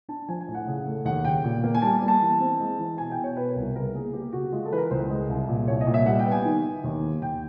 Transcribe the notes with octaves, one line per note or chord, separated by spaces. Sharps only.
D4 A5
F3 G#5
G#5
A2
F#5
C#3
A3
D#2 F#5
C#3 G5
A#2
A#3
G#5
G3 A5
A#3
A5
E3
C4
G#3
E3
B2 G#5
G5
B2
C#5
B2 B4
A#4
C2
A#4
C#3 A#4
A#3 G#4
A#3 G4
C#3 F#4
G#3 F4
A4
E3 B4
A#4
C#2 C5
G#3
C2
A#2
C2 C#5
D#5
A#2
E5
G3 F#5
G5
B3
G#5
D#3
D#3
D#2
A#3
D#2 G5